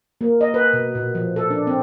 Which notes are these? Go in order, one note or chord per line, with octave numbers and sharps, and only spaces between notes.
A#3
D#5
B4
B2
A#2
F3
A4
D4
C4